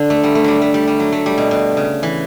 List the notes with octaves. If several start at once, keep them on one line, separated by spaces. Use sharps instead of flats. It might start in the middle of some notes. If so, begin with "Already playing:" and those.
Already playing: D3
A3
G3
A3
F#3 G3
A3
G3
G3
F#3
A3
G3
B2
B2
C#3
E3